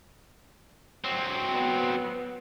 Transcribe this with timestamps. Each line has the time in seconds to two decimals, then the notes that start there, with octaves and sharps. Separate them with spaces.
1.04 F#3 C4
1.55 B3